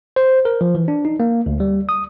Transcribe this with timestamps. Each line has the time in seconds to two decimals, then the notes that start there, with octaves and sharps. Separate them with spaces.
0.16 C5
0.45 A#4
0.61 F3
0.75 E3
0.88 D4
1.05 D#4
1.20 A#3
1.46 D2
1.60 G3
1.89 D#6